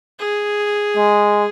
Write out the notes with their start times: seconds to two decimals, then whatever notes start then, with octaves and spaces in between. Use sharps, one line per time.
0.19 G#4
0.97 G#3